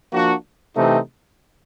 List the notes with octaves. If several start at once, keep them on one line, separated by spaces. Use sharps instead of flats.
F3 A#3 D4 F#4
C3 E3 A3 C4 D#4